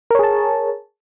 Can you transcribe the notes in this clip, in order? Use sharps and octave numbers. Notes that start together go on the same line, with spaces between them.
G#4 A#4 C#5 A5